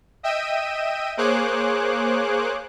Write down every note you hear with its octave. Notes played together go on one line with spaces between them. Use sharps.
D#5 E5 G5 E6 D#7
A#3 G#4 C5 C#5 D6 F#6